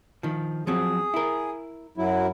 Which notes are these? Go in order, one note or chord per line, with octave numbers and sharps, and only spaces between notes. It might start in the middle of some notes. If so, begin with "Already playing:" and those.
D#3 F3
F3 F#3 C4 G#4
E4 A#4
F#2 F#3 E4